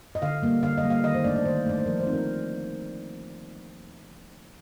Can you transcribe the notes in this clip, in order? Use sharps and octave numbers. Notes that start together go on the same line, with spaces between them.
D#5
D3 F5
G3 A#3
D3 F5
D#5
G3 A#3
F5
D#3 D#5
C5
A3 D4 D5
D5
D#3 C5
A3 D4 D5
C5
F3 A#4
C5
C4 D#4
A#4